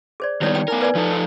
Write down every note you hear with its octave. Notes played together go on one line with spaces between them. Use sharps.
G#4 C5 D5
D#3 G3 B3 E4 C#5 D5
G5
B3 D#4 A#4 G#5
B4 D5 G#5
F3 D#4 A4